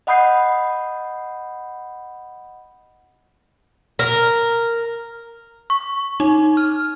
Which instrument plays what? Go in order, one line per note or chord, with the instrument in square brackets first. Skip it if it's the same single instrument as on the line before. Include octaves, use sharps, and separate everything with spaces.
[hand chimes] D#5 F#5 B5 D#6 G6 C7
[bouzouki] A#4
[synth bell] C#6
D#4
F6